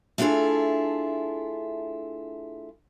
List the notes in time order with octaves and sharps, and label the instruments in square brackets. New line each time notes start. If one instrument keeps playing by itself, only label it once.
[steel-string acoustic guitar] A3 D4 E4 F4 G#4 A4